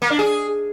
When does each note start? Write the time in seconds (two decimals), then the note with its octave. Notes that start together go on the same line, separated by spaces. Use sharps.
0.02 A#3
0.10 D4
0.19 G#4